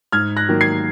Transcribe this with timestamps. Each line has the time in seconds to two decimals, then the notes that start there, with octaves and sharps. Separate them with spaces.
0.12 G#2 F6 G#6
0.36 F#6 A#6
0.49 D#3 F#3 A#3
0.61 G#6 C7